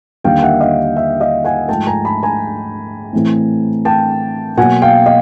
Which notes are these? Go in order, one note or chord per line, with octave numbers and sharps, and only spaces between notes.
D#2 D3 G3 A#3 F5 G5
E5 F#5
D#5 F5
E5
D#5 F5
F#5 G#5
G#2 F3 A3 G5 A5
G#5 A#5
A5 B5
G#5 A#5
A2 E3 A3 C4
G5 A5
B2 F#3 A#3 F#5 G#5
F5 G5
D#5 F5